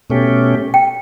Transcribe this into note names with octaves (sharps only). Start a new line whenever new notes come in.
B2 A3 C#4 G4
G5